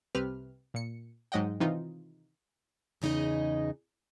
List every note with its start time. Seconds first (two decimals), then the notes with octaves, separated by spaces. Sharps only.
0.15 C2 C3 G4 B4 F6
0.74 A#2 C#7
1.32 G#2 F#3 D#5 F#5 G5
1.60 C3 D#3 E3 D#4 F4
3.02 E2 C#3 D#4 G#4 D#5